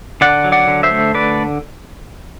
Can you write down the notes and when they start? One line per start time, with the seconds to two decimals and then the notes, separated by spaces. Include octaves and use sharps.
0.21 D3 D5 F#5
0.44 F#3
0.52 D5 F#5
0.68 D3
0.83 C5 E5
0.91 A3
1.14 D3 B4 D5